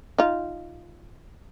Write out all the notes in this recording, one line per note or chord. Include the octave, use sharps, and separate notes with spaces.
D#4 F4